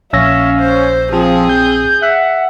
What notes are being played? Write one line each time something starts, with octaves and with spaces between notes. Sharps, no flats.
A#1 C#4 E5 F5 E6 A#6
C5
F3 C4 G#4
G6
E5 F#5